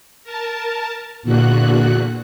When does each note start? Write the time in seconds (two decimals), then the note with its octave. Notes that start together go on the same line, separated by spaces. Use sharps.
0.24 A#4 A5
1.22 E2 A#2 D3 F#4 F#6